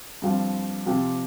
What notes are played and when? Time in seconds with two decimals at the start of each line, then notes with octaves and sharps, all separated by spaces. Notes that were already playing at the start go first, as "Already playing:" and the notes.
0.22 G2 F3 C4
0.85 C3 F3 C4 G4